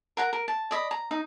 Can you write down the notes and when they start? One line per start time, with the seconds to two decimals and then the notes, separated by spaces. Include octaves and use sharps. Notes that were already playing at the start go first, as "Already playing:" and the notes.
0.17 A#4 F#5 A#5
0.33 A#4
0.48 A5
0.71 D5 D#5 B5
0.91 A#5
1.11 D#4